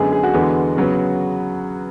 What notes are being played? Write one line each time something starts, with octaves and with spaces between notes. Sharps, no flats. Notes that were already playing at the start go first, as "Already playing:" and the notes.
Already playing: F#2 D3 G#3 B3 G#4
G#4
F#4
E2 D3 G#3 B3
C#3 F#3 B3